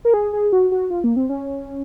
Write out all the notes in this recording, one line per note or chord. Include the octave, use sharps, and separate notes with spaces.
A#4
G#4
G#4
F#4
F#4
F4
A#3
C4
C#4